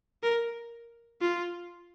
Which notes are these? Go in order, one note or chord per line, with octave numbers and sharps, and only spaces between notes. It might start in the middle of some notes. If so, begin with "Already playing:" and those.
A#4
F4